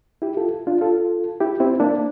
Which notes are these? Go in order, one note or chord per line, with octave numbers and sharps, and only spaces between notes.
E4 G4
F4 A4
D4 F4
F4 A4
E4 G4
C4 E4
A#3 D4